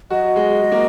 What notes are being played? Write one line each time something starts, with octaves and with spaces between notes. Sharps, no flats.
F#3 F#4 D#5
G#3
G#3
A#3